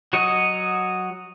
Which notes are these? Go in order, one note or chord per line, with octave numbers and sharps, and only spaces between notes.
F#3 F#4 C#5 D#5